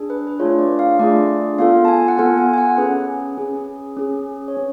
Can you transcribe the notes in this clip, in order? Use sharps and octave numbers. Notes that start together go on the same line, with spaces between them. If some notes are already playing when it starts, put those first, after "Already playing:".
Already playing: D4 G#4
B4
B4
A3 D4 F4 G#4 C#5
D5
F5
A3 D4 F4 G#4 D5
B3 F4 A4 F5
A5
G#5
F#5
B3 F4 A4 G#5
G#5
G#5
F#5
C#4 G#4 B4
C#4 G#4
C#4 G#4
C#5
C#4